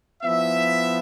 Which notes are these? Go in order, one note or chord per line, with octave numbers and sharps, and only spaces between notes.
F3 B3 E4 E5